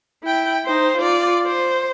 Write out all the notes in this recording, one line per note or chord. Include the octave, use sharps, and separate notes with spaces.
E4 G5
D#4 C5
F4 D5
C5